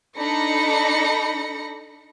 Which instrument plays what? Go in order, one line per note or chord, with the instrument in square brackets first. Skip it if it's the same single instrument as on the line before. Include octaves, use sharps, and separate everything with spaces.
[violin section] D4 D#4 A4 B5 A#6 C#7